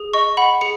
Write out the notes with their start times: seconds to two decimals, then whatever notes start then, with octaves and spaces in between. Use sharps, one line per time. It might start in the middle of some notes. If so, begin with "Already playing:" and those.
Already playing: G#4
0.13 D#5 C#6
0.37 F#5 B5
0.61 G#4 C#7